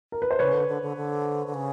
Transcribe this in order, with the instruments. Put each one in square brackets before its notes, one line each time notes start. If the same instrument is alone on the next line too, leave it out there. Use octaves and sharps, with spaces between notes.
[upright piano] A#4
B4
C5
[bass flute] C#3 [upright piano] B4 C#5
[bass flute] D3
D3
D3
D3
D3
C#3